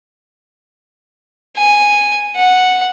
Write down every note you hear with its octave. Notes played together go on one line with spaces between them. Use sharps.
G#5
F#5